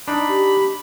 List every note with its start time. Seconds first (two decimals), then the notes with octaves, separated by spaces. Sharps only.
0.08 D4 D#4 B5
0.28 G4